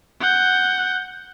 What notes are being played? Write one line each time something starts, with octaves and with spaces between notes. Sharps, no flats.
F#5 G6